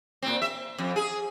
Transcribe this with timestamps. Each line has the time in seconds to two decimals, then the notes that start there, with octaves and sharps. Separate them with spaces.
0.22 A#2 C4
0.42 E5
0.78 F2
0.96 G#4